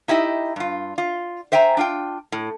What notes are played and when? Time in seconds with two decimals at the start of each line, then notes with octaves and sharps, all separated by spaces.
0.08 D#4 E4 G4 D#5 E5
0.56 G2 F4
0.98 F4
1.52 C5 E5 G5 G#5 A#5
1.77 D4 F4 G5
2.32 A2